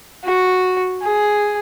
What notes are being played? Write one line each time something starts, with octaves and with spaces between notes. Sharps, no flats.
F#4
G#4